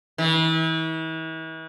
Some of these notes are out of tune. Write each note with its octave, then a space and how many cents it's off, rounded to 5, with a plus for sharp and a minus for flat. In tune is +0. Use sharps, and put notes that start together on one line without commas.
E3 -40